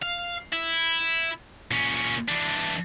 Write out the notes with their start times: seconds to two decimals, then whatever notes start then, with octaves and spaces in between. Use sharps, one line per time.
0.03 F5
0.52 E4
1.71 A#2 C#4
2.28 E3 D4